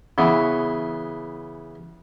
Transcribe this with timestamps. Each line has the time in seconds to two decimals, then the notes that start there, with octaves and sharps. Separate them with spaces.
0.18 C#3 E3 B3